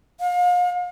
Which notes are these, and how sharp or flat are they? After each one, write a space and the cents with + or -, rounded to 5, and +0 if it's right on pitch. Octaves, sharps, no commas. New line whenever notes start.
F5 +35